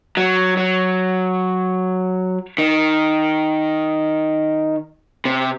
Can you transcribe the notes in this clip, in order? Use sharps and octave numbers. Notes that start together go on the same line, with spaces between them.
F#3
F#3
D#3
C3